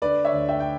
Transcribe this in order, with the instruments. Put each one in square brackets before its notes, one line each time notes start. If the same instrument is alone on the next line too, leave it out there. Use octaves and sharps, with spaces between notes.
[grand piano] D3 B4 D5
C#5 E5
D2
E5 G5
G5